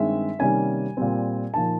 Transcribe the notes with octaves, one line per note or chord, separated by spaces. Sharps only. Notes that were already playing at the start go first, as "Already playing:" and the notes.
Already playing: G2 D#3 G#3 C4 E5
C3 D#3 G3 A#3 C#4 G#5
A#2 G3 C4
A#2 F3 A#3 D#4 A5